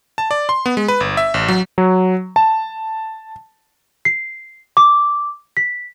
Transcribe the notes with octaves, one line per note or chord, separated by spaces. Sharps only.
A5
D5
C6
B3
G#3
B4
G1
E5
A1
F#3
F#3
A5
C7
D6
B6